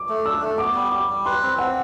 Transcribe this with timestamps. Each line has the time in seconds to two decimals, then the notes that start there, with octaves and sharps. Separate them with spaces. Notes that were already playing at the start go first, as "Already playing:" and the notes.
Already playing: D6
0.09 A3
0.25 D4 E6
0.42 A3
0.58 B3 D6
0.75 G3
0.92 G3 D6
1.09 G3
1.26 B4 C6
1.43 C4
1.59 C4 F#5